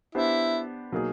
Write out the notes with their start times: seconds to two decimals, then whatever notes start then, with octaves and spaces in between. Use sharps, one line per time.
0.15 B3 D4 E4 G4 C5
0.92 B2 F#3 A#3 D#4 G#4